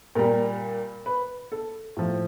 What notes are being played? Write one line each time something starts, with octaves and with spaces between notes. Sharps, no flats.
A#2 G3 A#4
B4
A4
A2 F3